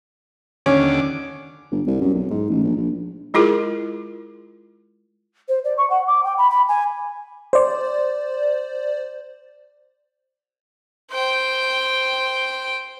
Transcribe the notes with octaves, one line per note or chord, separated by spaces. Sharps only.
D#2 D3 C#4 D6
G1
C2
F#2
B1
G#2
A1
A#1
A#1
G#3 E4 F4 G#4 A#4
C5
D5
C#6
F#5
D6
G5
B5
B5
G#5
C5 D5
C5 G5